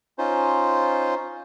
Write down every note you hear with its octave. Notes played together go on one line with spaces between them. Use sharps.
C#4 D#4 F4 C5